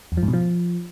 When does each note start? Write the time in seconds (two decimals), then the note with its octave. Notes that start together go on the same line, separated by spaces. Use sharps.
0.12 E2
0.17 F3
0.23 G#2
0.28 B2
0.33 F3